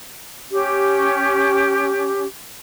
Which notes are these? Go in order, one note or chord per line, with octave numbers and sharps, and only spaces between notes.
C#4 G4